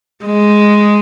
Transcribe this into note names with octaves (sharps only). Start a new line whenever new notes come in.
G#3